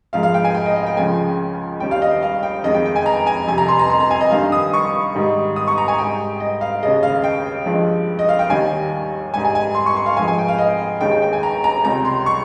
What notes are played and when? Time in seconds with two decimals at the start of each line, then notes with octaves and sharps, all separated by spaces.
0.13 G#2 F3 G#3 F5
0.23 F5
0.34 G5
0.44 G#5
0.54 G5
0.66 D#5
0.76 D#5
0.86 G5
0.97 C#2 C#3 F3 G#3 G#5
1.80 D#2 D#3 G3 G5
1.91 F5
2.02 D#5
2.23 F5
2.43 G5
2.64 F2 D#3 G#3 D#5
2.74 G5
2.86 G5
2.96 G#5
3.06 A#5
3.27 G#5
3.47 F2 C3 G3 G#5
3.58 A#5
3.68 C6
3.79 A#5
3.90 C6
4.00 A#5
4.11 G#5
4.21 D#5
4.31 G2 D#3 G3 F5
4.52 D#6
4.74 C#6
5.15 G#2 D#3 G3
5.56 D#6
5.68 C#6
5.78 A#5
5.88 G#5
5.99 G#2 G3 G5
6.40 D#5
6.61 F5
6.82 D#2 C#3 G#3 D#5
7.03 F5
7.24 G5
7.66 G2 F3 G#3
8.19 D#5
8.29 F5
8.39 G5
8.50 D#2 D#3 G3 G#5
9.34 G#2 G3 G#5
9.44 G#5
9.55 G#5
9.75 C6
9.86 C#6
9.97 C6
10.06 F5
10.17 G#2 F3 G#3 G#5
10.28 G#5
10.38 G5
10.48 F5
10.58 D#5
11.01 D#2 D#3 G#3 G5
11.12 G5
11.22 G5
11.33 G#5
11.43 A#5
11.64 A#5
11.84 C#2 C3 G3 A#5
12.05 C6
12.26 C#6